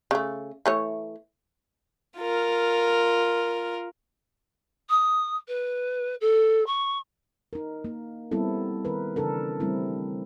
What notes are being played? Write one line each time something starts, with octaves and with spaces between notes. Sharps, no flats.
C#3 A3
E3 A3 C#5
F4 A#4
D#6
B4
A4
C#6
D#4 A#4
A#3
G3 B3 C4 E4 A4
D#3 A#4 B4
C#3 E3 D4 A4 A#4
G3 A3 C4 E4